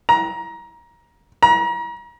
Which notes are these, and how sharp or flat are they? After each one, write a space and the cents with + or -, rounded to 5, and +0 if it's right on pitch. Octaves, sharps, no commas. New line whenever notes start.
A#5 +20
A#5 +35